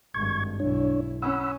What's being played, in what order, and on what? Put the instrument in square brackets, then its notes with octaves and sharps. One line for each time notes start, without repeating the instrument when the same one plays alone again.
[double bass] G#1 G2 [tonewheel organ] C#6 G#6
[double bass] B1 E4 [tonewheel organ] D4 C#5
[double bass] C#4 [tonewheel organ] F#5 B5 E6